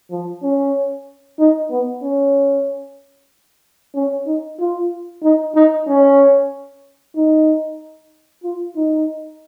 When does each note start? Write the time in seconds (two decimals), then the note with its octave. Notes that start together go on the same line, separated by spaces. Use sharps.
0.11 F3
0.43 C#4
1.39 D#4
1.70 B3
2.03 C#4
3.95 C#4
4.27 D#4
4.60 F4
5.23 D#4
5.55 D#4
5.87 C#4
7.16 D#4
8.43 F4
8.76 D#4